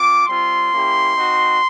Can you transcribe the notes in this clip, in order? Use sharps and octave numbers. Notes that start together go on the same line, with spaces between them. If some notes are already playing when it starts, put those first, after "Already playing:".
Already playing: C4 F4 D6
G3 C4 F4 C6
A#3 C#4 E4 G4
C4 D#4 F#4